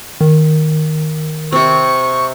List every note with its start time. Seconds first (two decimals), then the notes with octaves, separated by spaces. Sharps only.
0.21 D#3
1.52 C3 C4 C#6